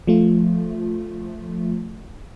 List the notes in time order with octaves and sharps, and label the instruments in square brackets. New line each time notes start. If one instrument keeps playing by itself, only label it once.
[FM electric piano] F3 A3 F4